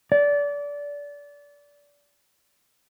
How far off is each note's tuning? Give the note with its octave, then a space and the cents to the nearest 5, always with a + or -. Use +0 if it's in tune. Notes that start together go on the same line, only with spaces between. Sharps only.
D5 -25